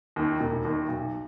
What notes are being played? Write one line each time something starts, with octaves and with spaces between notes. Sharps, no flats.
D#2 D#3
E1
D#2 D#3
B1